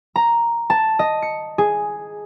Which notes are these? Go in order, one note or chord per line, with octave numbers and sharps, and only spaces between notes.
A#5
A5
D#5
C#7
G#4